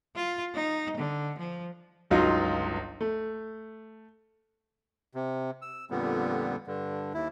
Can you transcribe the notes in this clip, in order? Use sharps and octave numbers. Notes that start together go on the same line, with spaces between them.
F4
D#4
D3
F3
G1 C#2 F#3 D#4 F4
A3
C3
E6
F2 A#2 D3 G3 B3
G2 D3
D#2 E4